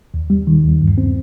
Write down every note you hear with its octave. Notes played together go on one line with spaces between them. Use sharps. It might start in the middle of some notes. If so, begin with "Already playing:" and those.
D#2
G3
D#3
D#2
G2
C4